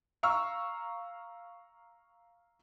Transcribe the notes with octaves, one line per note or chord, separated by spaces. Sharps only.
F5 A#5 C#6 E6 F6